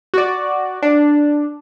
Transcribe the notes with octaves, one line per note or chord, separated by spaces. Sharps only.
F#4 D5
D4